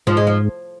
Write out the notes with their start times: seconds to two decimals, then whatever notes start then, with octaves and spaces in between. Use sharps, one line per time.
0.07 G#2 F3
0.17 G#3
0.27 F3